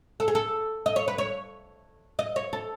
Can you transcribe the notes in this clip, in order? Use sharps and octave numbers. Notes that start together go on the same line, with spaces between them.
A4
G#4
A4
D#5
C#5
B4
C#5
D#5
C#5
A4